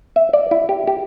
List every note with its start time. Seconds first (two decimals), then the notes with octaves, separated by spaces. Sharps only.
0.16 E5
0.33 D5
0.51 E4
0.69 G4
0.87 G4